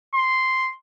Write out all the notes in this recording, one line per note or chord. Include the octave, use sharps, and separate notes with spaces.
C6